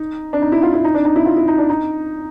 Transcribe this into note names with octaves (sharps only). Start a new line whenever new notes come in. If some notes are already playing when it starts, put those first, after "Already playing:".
Already playing: D#4
D4
D#4
E4
F4
E4
D#4
D4
D#4
E4
F4
E4
D#4
D4
D#4